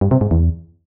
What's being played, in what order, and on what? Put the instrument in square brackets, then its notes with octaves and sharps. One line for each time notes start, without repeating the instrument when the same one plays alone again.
[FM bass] G2
C3
G#2
E2